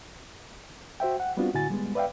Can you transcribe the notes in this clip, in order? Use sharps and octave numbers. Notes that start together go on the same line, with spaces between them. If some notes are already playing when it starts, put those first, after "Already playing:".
F#4 C5 E5 G5
F#5
G3 B3 C4 D4 F4 F#4
A2 D3 E4 F#4 G#5 A6
G3 G#3 B3
B4 D5 E5 F5 G5